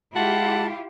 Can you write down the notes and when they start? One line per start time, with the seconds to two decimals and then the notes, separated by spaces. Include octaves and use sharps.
0.16 G#3 E4 F4 G4 F#5 A5